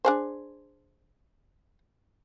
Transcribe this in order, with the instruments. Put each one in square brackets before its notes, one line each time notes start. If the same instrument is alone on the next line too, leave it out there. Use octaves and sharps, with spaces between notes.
[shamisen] D4 G#4 C5